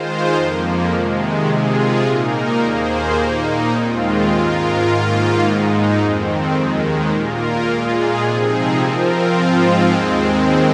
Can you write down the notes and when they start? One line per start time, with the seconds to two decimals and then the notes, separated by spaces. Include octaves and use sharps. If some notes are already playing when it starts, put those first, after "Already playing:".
Already playing: D#3 G#3 F4 C5
0.33 F2 F3 A#3
0.90 C3 D#3 G#3
1.47 C3 G#3 F4 G#4
2.02 A#2 A#3 D#4 A#4
2.60 D#2 D#3 A#3 G#4 C5
3.15 A#2 A#3 D#4
3.71 D#2 D#3 G#3 C4 F4
4.28 G#2 G#3 F4 A#4
4.84 G#2 D#3 A#3 F4
5.41 G#2 G#3 D#4
5.97 F2 D#3 C4
6.53 D#2 D#3 G#3
7.09 A#2 A#3 F4 A#4
7.66 A#2 G#3 F4 G#4
8.22 C3 F3 C4 D#4 G#4
8.79 F3 C4 F4 A#4
9.35 G#2 F3 G#3 C4 F4
9.92 D#2 D#3 G#3 C4